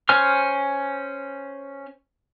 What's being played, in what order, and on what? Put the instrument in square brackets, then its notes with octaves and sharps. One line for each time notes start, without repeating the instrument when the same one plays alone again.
[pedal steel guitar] C#4 C5 G#5 F6